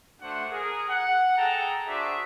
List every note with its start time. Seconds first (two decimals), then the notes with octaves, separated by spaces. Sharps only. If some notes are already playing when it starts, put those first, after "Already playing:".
0.21 A3 D4 F#4 C5 F#5
0.50 G#4 A#4
0.89 F#5
1.37 G#4 A4 G5 A5 A#5
1.87 D4 F#4 G#4 C5 D5 E5